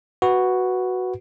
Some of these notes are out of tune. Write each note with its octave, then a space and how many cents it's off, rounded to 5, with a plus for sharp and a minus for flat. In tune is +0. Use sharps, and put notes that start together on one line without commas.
F#4 +0 B4 +0